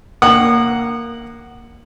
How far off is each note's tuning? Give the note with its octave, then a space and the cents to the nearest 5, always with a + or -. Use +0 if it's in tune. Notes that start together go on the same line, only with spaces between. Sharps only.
A#3 +0 F#5 +0 D#6 -35